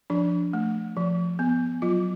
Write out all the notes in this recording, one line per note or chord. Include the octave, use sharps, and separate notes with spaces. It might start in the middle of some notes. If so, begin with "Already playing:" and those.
F3 D4
A3
F3
B3
F#3 F4